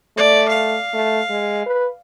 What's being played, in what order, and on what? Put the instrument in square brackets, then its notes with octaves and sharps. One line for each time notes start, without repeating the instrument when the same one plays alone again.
[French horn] A3 [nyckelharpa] D5
[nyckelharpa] F5
[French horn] A3
G#3
B4